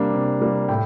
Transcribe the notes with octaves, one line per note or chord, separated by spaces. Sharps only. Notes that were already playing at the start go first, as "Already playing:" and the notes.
Already playing: C3 G3 A#3 D4
C3
G3 A#3 D4
A2 G5